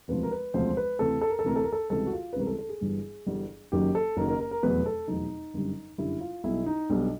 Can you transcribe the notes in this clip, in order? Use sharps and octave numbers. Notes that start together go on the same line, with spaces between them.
E1 D2 C3 F3 B4
A#4
B4
E1 D2 C3 F3 C5
B4
D2 C3 E3 A4
A4
A#4
A4
D2 C3 E3 A#4
A4
A#4
A4
C#2 C3 E3 G3 A4
F#4
F4
B4
C#2 C3 E3 G3 A#4
A4
A4
G#4
G1 G2 E3 G3
G1 G2 E3 G3
F#1 F#2 D#3 F#3 G4
A4
F#1 F#2 D#3 F#3 A#4
A#4
A#4
A#4
F1 E2 B2 F#3 B4
A4
F1 E2 B2 F#3 D#4
G1 F#2 D3 G3
G1 F#2 D3 G3 E4
F4
B1 B2 G3 E4
D#4
B1 B2 G3 D4